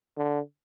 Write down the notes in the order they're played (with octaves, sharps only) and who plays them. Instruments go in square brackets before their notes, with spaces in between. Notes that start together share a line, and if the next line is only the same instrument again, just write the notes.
[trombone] D3